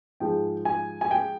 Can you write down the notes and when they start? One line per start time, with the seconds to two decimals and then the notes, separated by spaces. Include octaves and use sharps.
0.20 G#2 F3 G#3 G5
0.65 G#5
1.01 G#5
1.11 G5